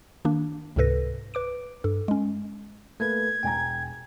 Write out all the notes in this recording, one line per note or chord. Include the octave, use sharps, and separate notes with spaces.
D#3 A#3 D4
C#2 G#2 C3 A4 B4 A#6
B4 D6 D7
G2 A4
G#3 C#4
A3 A#3 A4 B4 G#6
E1 G5 G#5 A#5